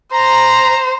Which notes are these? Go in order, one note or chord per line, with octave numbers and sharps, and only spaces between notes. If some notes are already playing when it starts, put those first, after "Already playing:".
C5 A#5